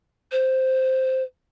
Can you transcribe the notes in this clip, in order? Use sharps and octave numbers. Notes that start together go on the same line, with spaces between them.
C5